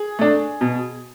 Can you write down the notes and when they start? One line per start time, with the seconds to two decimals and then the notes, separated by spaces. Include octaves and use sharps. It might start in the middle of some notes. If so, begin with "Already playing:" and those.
Already playing: G#4
0.19 A3 D4
0.61 B2